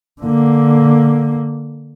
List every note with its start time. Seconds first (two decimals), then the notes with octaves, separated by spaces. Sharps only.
0.22 D3 A#3